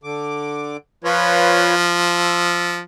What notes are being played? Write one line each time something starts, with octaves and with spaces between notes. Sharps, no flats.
D3 D6
F3 F4 B4 C#5
E6